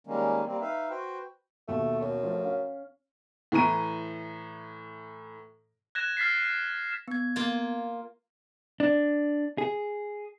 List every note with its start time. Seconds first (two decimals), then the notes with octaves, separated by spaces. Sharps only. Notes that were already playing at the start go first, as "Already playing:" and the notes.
0.07 D#3 G3 G#3 A#3 C#4
0.46 G3 A#3 C4
0.61 D#4 B4 E5 F5
0.90 F#4 B4 C5 G5
1.68 D#2 B2 A3
2.01 F#2
2.23 F3 A3
2.44 C#4 F5
3.52 A2 E3 A#5 D#7
5.95 F#6 G#6 A#6 E7
6.17 F6 A6 B6 C7
7.08 B3 G#6
7.36 A#3 F4
8.80 D4
9.58 G#4